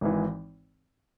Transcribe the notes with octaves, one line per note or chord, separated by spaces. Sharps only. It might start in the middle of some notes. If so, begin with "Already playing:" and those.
G#1 G#2 E3